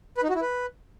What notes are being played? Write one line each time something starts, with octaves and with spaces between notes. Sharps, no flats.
B4
D#4
F#4
E4
B4